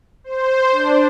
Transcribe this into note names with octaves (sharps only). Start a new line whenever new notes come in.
C5
D4